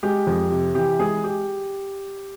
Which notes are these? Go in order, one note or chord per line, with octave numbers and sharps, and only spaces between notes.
G#3 G4
F2
C3
E3 G4
G#3 G#4
G4